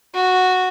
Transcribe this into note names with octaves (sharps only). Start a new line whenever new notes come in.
F#4